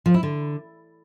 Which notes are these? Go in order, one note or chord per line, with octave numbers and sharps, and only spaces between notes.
F3
E4
D3